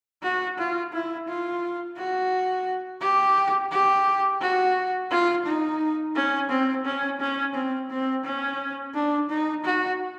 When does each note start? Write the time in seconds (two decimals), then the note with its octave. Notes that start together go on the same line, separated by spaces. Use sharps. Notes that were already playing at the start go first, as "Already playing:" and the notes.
0.23 F#4
0.58 F4
0.93 E4
1.28 F4
1.97 F#4
3.01 G4
3.72 G4
4.41 F#4
5.11 F4
5.46 D#4
6.15 C#4
6.50 C4
6.85 C#4
7.20 C#4
7.55 C4
7.90 C4
8.24 C#4
8.94 D4
9.30 D#4
9.65 F#4